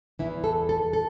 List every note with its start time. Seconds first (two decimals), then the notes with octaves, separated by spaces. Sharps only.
0.19 E2 E3 E4
0.44 A4
0.69 A4
0.93 A4